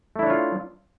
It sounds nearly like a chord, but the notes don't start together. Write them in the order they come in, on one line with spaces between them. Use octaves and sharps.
A3 E4 D4 C#5 F4